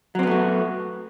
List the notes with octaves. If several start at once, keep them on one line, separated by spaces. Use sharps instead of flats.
F#3 A3 B3 C4 F#4